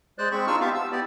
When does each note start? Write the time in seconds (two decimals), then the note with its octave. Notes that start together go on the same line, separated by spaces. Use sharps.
0.18 G#3 C5 D5 F#6
0.32 G#3 C4 B5 C#6
0.47 D4 D#4 F4 C#6 E6 F6
0.61 B3 G4 E5 F5 A5
0.74 E6
0.92 B3 E4 G4 D5